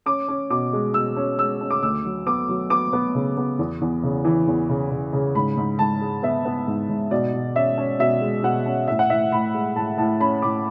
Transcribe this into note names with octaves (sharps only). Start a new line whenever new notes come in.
C#4 D6
C#4
B2 D6
G#3
B2 E6
C#4
G#3 E6
C#4
D6
D2 E6
F#3
B3 D6
F#3
B3 D6
B3
C#3
B3
E2
E2
C#3
E3
E2
C#3
C#3
C#3
G#2 B5
G#2
G#2 A5
G#3
B3 E5
B3
G#2
G#2
B2 D5
B2
C#4 E5
C#4
B2 E5
G#3
B2 F#5
C#4
A2 E5
F#5
A2 E5
A2 B5
G#3
A2 A5
A2 A5
C#4 B5
A2 D6